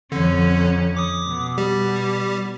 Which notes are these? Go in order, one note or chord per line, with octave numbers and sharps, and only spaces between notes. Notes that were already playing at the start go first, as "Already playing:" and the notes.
F2 D3 C#4
D6 D#6
B2
G3 G4